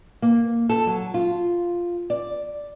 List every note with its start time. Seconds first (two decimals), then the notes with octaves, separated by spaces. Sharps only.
0.22 A#3
0.69 A4
0.87 F#3
1.14 F4
2.10 D5